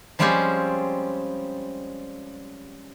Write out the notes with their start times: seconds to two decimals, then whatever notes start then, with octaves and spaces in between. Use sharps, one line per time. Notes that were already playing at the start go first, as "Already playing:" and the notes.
0.19 F3 G3 G#3 C4 C#4 G4